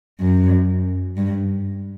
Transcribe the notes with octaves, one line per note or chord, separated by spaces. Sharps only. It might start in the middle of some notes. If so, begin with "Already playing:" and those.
F#2
G2